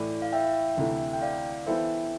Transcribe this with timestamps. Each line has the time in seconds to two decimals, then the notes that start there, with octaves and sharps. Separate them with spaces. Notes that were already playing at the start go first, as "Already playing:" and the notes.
Already playing: A2 E3 A3 E4 D5
0.22 F5
0.33 E5 G5
0.77 D2 C3 E3 A3 E4
1.13 G5
1.22 D5 F5
1.66 E3 B3 E4 A4 C5 E5 G5